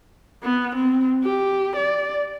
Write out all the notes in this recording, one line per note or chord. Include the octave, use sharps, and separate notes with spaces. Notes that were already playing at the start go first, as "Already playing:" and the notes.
B3
C4
G4
D5